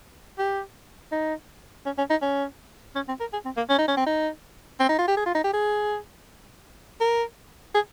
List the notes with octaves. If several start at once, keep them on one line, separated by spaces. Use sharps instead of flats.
G4
D#4
C#4
C#4
D#4
C#4
C#4
C4
A#4
G#4
C4
A#3
C#4
D#4
C#4
C4
D#4
C4
D#4
F4
G4
G#4
F4
D#4
G4
G#4
A#4
G#4